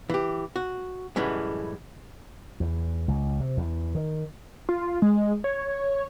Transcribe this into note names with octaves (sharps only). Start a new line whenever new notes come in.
E3 G4
F#4
F#2 A2 C#3 E3 G3 G#3
E2
C#2
C3
E2
D#3
F4
G#3
C#5